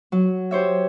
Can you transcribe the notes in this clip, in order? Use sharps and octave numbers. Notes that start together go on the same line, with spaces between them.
F#3
G4 C5 C#5 E5